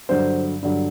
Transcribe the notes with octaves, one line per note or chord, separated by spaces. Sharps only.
G2 D3 F#3 C5
G2 D3 F#3